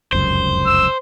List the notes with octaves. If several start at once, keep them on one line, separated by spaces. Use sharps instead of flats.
F1 C#2 F#2 C5
E6